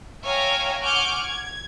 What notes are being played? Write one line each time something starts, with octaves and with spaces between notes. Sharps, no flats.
C#5 E5 F5 G5 G#5 A#5
F#5 G#5 C#6 D6 F6 G6
G#6